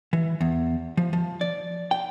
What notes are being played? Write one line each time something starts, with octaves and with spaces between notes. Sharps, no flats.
E3
E2
F3
F3
D5
G5